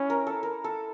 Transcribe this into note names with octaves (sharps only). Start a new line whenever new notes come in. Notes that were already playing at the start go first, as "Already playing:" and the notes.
Already playing: C#4 E4
A#4
A4
A#4
A4